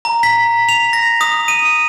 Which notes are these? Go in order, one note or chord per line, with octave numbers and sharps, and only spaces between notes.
A#5
B6
F7
A#6
D#6
D#7